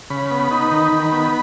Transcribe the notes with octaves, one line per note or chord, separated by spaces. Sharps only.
C#3 B5
B3 B5
D#4
D#3
D#3
B3